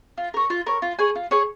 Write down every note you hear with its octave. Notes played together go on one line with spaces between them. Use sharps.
F4
A#4 C#5
F4
A#4 C#5
F4
G#4 C#5 G#5
F4
G#4 C#5 G#5